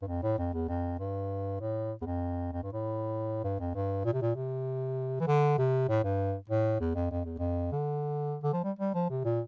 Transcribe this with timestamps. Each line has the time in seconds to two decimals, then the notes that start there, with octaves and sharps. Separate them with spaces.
0.02 G2
0.08 F2
0.23 A2
0.38 F2
0.53 E2
0.68 F2
0.99 G2
1.61 A2
2.02 E2
2.06 F2
2.53 F2
2.63 G2
2.73 A2
3.44 G2
3.60 F2
3.75 G2
4.05 A#2
4.14 C3
4.22 A#2
4.35 C3
5.20 E3
5.27 D3
5.58 C3
5.89 A2
6.04 G2
6.49 A2
6.80 E2
6.95 F2
7.11 F2
7.25 E2
7.38 F2
7.72 D3
8.43 D3
8.53 F3
8.64 G3
8.79 G3
8.95 F3
9.10 C3
9.25 A#2